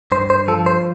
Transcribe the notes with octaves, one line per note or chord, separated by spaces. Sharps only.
G2 C5
C5
F3 A4
C5